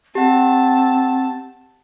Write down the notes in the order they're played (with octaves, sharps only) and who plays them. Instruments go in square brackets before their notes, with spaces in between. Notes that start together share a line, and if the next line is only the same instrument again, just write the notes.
[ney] C4 [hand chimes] G4 F#5 [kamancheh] A5